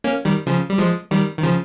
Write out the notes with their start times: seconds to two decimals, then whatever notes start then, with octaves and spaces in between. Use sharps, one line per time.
0.04 A#3 C#4
0.25 D#3 G3
0.47 C#3 F3
0.70 G3
0.78 F3 G#3
1.11 D#3 G3
1.38 D#3
1.43 C#3 F3